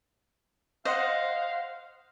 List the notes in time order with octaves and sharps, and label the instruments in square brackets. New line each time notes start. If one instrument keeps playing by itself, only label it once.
[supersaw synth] C5 F#5 [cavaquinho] D#5 [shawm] F5